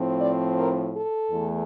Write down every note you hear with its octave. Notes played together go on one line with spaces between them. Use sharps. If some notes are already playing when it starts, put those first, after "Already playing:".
Already playing: A2 F3 C4
D5
A#4
A4
E2 E3 A3